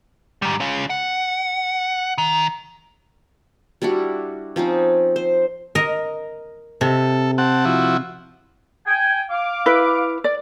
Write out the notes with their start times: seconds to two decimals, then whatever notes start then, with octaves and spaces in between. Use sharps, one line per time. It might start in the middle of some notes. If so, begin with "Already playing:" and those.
0.42 G#2 G3
0.60 C#4 F4
0.90 F#5
2.18 D#3
3.82 G3 D4 E4 F#4
4.56 F3 C4 C#4 D#4
5.16 C5
5.75 A#4 D#5
6.81 C3 A4
7.38 C4 F#5 A5
7.65 F3 E4 F#4
8.86 G5 G#5
9.30 F5 D6
9.66 E4 B4
10.24 D5